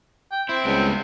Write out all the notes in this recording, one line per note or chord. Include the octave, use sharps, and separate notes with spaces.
G5
C4 E4
C#2 G3 B3